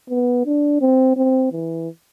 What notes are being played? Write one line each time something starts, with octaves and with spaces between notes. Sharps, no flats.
B3
D4
C4
C4
E3